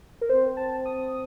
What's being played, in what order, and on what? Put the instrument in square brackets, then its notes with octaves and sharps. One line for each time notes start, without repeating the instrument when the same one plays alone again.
[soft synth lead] A#4
[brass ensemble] C4 [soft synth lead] C5
[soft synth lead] A5
D#6